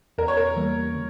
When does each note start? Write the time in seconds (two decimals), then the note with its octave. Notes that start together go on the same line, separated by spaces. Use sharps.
0.18 E2 A#4
0.28 C#5
0.37 A#4
0.56 E3 G3 A#3
0.95 D3